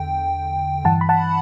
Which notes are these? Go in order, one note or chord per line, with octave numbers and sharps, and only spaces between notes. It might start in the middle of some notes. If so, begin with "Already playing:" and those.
Already playing: E2 D3 G5
G2 E3 F#5 A5
B5
F#5 A5